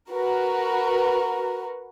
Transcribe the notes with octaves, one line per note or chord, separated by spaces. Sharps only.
F#4 A#4 B4